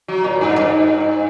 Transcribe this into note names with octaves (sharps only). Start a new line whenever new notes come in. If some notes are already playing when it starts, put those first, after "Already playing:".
F#3
A#2
G2
G2